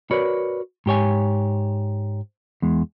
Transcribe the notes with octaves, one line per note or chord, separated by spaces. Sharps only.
F#4 A#4 B4 C#5 D5
G#2 G4 C#5 G#5
E2 G#3